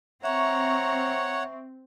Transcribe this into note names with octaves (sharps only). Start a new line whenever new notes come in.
C4 C#5 E5 F#5 A#5 C#6